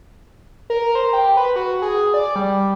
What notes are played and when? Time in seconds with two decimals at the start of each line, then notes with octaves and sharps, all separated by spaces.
0.70 A#4
0.95 C5
1.13 G4
1.37 B4
1.56 F#4
1.82 G#4
2.14 D5
2.36 G3